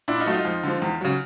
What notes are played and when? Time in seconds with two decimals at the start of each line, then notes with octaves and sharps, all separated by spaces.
0.08 A#2 D4 E4
0.20 D#4 F4
0.26 F#3 A3
0.32 D#4 F4
0.45 F2
0.63 D3 F3
0.82 E2
1.01 C#3 F#3